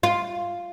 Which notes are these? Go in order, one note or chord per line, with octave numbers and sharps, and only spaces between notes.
F4